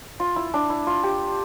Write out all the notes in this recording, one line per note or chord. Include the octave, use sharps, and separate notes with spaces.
F4
E4
D4
E4
F4
G4